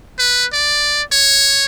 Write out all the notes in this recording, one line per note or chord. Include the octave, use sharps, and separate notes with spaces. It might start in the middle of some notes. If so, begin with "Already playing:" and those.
B4
D5
C#5